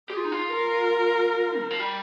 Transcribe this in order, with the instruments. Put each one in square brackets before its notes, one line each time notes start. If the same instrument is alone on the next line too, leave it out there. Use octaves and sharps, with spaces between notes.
[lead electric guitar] G4 [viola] G#4
[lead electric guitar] F4
D#4
F4
[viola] A#4
[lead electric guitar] D#3
F3
G3